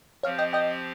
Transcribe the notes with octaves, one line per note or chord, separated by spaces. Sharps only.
F3 C4 G4 C#5 F5
D#5 G5
D#5 G5